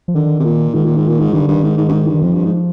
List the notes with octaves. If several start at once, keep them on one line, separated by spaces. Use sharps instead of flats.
F3
D3 D#3
C3
A#2
G#2 D#3
A#2
G#2
A#2
G#2
G2 D#3
D3
G2 D#3
G#2
G#2
G2
G#2
G2
D#3
F2 F3
G2
G#2